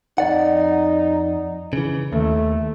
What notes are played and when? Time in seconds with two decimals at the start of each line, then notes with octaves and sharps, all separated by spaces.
0.18 F2 D#4 D5 F#5
1.73 C#3 E3
2.13 D#2 A3